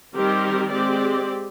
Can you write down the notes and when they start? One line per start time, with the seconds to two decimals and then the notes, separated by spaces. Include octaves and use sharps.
0.15 D#3 G3 C4 G4 A#4
0.72 G#3 C4 G4 D5